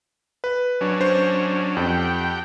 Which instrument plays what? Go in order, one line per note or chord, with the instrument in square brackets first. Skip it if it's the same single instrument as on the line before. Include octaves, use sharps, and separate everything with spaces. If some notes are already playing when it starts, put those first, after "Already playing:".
[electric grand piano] B4
[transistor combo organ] F#3 C#4 D4
[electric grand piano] C5
[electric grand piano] F2 [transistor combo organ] G4 F#5 G5